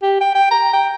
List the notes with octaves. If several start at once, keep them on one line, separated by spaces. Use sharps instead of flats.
G4
G5
G5
A#5
G5